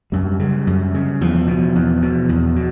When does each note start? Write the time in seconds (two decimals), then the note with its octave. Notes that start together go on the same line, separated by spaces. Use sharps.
0.12 F#2 G3
0.39 C#3
0.67 F#2
0.94 C#3
1.21 E2 F3
1.47 B2
1.75 E2
2.02 B2
2.29 E2
2.56 B2